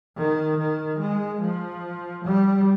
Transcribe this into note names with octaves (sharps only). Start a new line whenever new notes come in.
D#3
D#3
G#3
F3
G3